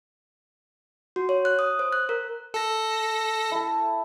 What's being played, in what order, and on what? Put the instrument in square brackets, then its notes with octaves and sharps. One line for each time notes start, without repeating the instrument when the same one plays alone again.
[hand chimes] F#4
C#5
F#6
D#6
C5
F#6
A#4
[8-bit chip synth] A4 A#6
[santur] E4 A4